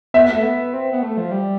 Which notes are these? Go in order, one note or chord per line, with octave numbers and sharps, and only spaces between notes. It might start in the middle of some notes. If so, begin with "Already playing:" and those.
B3 E5
A3
B3
C4
B3
A3
F3
G3